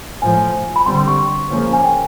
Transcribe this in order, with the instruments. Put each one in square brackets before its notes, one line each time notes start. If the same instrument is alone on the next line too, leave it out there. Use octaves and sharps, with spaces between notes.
[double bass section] A2 F3 A3 [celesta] G#5
[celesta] B5
[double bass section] D3 G3 C4 [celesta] C6
[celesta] C6
C#6
C6
[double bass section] C#3 F3 A#3 C#4
[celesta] G#5
G5